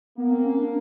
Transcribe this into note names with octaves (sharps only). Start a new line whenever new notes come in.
A#3 B3
C4
C#4
D4